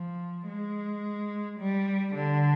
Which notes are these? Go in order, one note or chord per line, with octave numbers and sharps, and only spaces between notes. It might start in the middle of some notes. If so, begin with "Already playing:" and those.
Already playing: F3
G#3
G3
D3